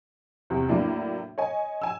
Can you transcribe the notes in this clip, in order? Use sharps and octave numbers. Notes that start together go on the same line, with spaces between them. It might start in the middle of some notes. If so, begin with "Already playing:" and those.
E2 C3
A2 F#3 A#3 D4 E4
C#5 D#5 G#5
G#5 E6